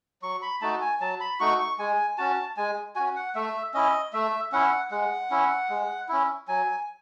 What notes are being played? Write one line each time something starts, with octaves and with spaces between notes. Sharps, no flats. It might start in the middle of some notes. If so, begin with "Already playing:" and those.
F#3 C#6
B5
A3 D#4 F#4 A5
G#5
F#3 A5
B5
A3 D#4 F#4 C#6
C#6
G#3 G#5
C#4 F#4 A5
G#3 G#5
C#4 F#4 G#5
F#5
A3 E5
C#4 E4 D#5
A3 E5
C#4 E4 F#5
G#3 F#5
C#4 E4
G#3
C#4 E4
F#3 G#5